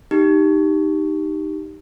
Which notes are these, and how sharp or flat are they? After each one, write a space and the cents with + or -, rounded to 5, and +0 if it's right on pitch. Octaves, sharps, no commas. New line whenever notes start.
D#4 +0 G4 +0